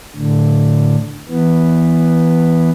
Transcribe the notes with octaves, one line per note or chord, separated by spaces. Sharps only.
A2 D3
E3 B3